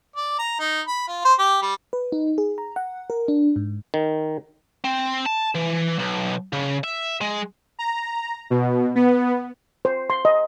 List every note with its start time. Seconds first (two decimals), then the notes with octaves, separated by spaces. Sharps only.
0.16 D5
0.38 A#5
0.59 D#4
0.87 B5
1.07 F4
1.25 C5
1.39 G4
1.62 G3
1.93 B4
2.12 D#4
2.38 G#4
2.58 A#5
2.76 F#5
3.10 A#4
3.28 D4
3.56 G#2
3.94 D#3
4.84 C4
5.26 A5
5.55 E3
5.99 B1
6.53 C#3
6.84 E5
7.21 G#3
7.79 A#5
8.50 B2
8.95 B3
9.85 C5
10.10 C6
10.25 D#5